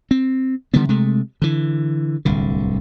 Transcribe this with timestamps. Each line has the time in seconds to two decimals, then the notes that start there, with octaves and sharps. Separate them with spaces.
0.11 C4
0.74 D3 D#3 G3 B3
0.89 C3 G#3 A3
1.42 D3 E3
2.25 D1 C2 D3